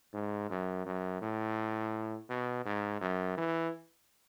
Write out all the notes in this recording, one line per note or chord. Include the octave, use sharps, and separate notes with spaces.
G#2
F#2
F#2
A2
B2
G#2
F#2
E3